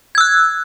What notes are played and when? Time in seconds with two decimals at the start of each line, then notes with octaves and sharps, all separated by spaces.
0.15 G#6
0.18 E6
0.21 F#6